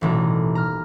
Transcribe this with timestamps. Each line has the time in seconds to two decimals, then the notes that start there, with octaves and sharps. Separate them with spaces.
0.01 D#1 A1 B2 A#5
0.55 A#5 F6